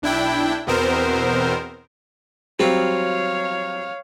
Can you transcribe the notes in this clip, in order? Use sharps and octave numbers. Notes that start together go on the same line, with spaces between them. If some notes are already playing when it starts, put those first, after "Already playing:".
B1 D4 E4 G5
E2 B2 B3 C4 A#4 C5
F#3 G3 C4 F4 C#5 F5